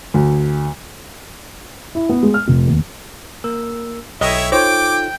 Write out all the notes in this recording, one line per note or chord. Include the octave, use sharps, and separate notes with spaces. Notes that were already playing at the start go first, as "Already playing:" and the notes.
D2
E4
B3
G#3
F6
F1
D#2
A#3 A#4 E6
B1 E4 A4 C#5 D#5 E5 G5
D#4 F4 A4 C5 C#5 G5 D6